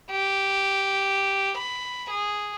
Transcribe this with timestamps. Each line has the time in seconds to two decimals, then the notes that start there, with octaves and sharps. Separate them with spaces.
0.11 G4
1.57 B5
2.10 G#4